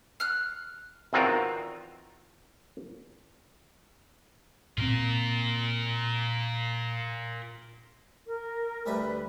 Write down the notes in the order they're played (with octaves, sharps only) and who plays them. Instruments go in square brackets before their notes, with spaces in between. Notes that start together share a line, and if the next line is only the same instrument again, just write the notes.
[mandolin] F6 F#6
[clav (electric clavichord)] E2 D#3 C4 F4 F#4 A#4
[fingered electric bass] A#2 C4 [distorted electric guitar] F4 A#4
[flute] A#4
[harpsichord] D2 G3 E5 [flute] B4